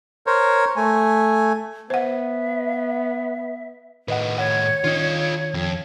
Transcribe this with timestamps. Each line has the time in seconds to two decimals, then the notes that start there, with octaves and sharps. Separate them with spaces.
0.27 A#4 C5 C#5
0.76 A3 G#5
1.90 B3 C5 E5 F#5
4.08 A2 D#3 B4 D#5 F#5
4.38 C#5 F#5
4.84 D#3 D4 F4 D#5
5.54 F2